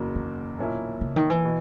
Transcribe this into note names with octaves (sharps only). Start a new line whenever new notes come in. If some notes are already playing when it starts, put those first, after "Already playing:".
Already playing: F#1 E2 C#3 F#3 A#3
D#3
B1 A#2 A#3 C#4 E4
C#3
D#3
E3
B2